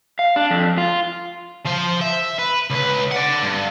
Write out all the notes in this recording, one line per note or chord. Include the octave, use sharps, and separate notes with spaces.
F5
D4
F2
F4
F3 C5
E5
B4
C#2 B4
D5 F#5
G2